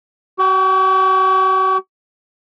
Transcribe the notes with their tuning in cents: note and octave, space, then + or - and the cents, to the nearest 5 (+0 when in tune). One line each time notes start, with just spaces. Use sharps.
F#4 +40 G5 +0